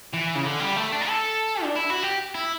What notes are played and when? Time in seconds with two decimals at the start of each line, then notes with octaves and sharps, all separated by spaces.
0.13 E3
0.35 C#3
0.45 D3
0.60 G3
0.76 A3
0.92 D4
1.08 A4
1.63 D4
1.76 E4
1.90 F#4
2.03 G4
2.35 E4